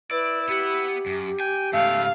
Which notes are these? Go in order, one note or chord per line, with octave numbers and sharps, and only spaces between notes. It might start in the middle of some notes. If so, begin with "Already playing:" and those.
E4 B4 D5
B3 G4 F#5
F#2
G5 G#5
G#2 C#3 A3 F5